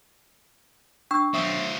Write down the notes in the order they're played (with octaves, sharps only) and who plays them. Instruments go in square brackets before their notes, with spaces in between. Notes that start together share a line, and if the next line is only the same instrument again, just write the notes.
[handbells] D4 G5 E6 [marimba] C#6
[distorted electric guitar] F#3 C5 [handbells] E5 D#6 E6